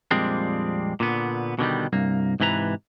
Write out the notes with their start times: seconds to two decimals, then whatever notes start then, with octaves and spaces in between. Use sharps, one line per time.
0.11 F2 A#2 G3 G#3 C4 D4
1.00 A#2 D3 B3
1.59 B2 D3 D#3 G3
1.93 C2 G2 A#3
2.40 G#2 C3 E3 B4 A#5